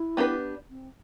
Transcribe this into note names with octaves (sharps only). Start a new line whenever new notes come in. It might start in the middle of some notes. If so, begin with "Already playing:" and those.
Already playing: E4
B3 D4 G4 B4
C4